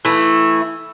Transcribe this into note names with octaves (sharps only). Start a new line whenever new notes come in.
E3 A3 E4